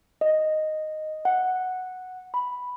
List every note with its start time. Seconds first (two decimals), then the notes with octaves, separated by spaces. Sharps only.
0.21 D#5
1.25 F#5
2.34 B5